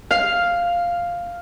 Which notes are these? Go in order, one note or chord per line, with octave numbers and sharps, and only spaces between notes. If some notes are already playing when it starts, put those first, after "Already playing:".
F5